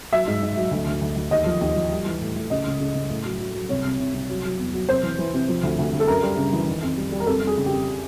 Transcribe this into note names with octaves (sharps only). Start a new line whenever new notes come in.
F#3 E5
G#2
G#2
F#3
D2
D2
D2
D2
D#2 D#5
F3
D#2
F3
G3
E3
A2
A2
C#3 D#5
C#2
C#3
C#3
A2
F#3
F#3
F#3
C2 C#5
C2
C2
C2
F#3
F#3
E2
F#3
C3 C5
E3
E3
C3
F3
D2
D2
D2
A4
F#2 A#4
G3
C#3
E3
D#3
F2
G3
G3
A#4
F2 A4
F2
G#4
C#3
G4
F2